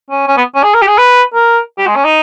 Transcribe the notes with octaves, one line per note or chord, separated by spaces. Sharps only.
C#4
C#4
B3
C#4
G#4
A#4
G4
G#4
B4
A#4
G4
G#3
C#4
D#4